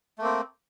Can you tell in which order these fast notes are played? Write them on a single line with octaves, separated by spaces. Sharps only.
A3 A#3 C4